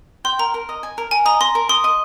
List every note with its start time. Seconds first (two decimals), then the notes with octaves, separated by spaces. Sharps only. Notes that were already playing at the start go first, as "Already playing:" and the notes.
0.25 G5 C6
0.39 A#4 A#5
0.54 A#4
0.69 D#5
0.83 G#5
0.98 A#4
1.11 A#4 G#5
1.26 D#5 A#5
1.41 A#5 C6
1.55 A#4
1.69 C6 D#6
1.84 D#5